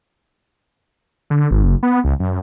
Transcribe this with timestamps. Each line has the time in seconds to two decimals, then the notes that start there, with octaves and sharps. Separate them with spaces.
1.30 D3
1.51 G#1
1.63 F#1
1.83 B3
2.04 C#2
2.19 F#2